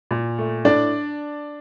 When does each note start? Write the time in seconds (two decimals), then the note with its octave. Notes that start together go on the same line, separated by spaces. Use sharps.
0.11 A#2
0.38 A3
0.65 A2 D4 D5